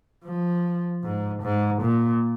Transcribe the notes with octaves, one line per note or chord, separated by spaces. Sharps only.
F3
G#2
G#2
A#2